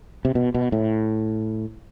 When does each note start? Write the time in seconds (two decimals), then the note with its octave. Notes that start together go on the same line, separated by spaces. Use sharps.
0.25 C3
0.35 B2
0.55 B2
0.72 A2